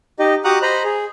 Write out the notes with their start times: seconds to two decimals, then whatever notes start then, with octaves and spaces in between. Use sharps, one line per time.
0.19 D#4 G4 D#5
0.44 F#4 G4 F#5 A#5 D#6 F#6
0.62 C5 D#5 A#5 B5
0.84 G#4